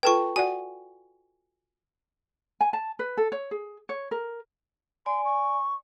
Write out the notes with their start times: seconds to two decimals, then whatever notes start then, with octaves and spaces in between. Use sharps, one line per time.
0.03 F4 A4 B4 G5 A5 C#6
0.36 F#4 D5 F#5 G#5
2.61 G#5
2.73 A5
2.99 B4
3.17 A4
3.32 C#5
3.51 G#4
3.89 C#5
4.11 A#4
5.06 D5 G#5 C6
5.25 C#6